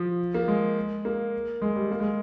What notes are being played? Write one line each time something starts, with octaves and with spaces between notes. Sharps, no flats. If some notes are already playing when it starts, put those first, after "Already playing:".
Already playing: F3
A#3
G#3
A#3
G#3
G3
A#3
G#3